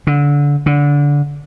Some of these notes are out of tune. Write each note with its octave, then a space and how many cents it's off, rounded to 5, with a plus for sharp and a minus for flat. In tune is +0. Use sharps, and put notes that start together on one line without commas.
D3 -25
D3 -20